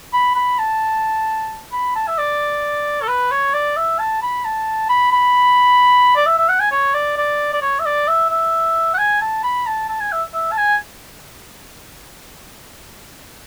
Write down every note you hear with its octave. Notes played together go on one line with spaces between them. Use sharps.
B5
B5
A5
B5
A5
E5
D5
A4
B4
C#5
D5
E5
A5
B5
A5
B5
B5
D5
E5
E5
F#5
G#5
C#5
D5
D5
D5
C#5
E5
D5
E5
E5
F#5
G#5
A5
B5
A5
A5
G#5
E5
E5
A5
G#5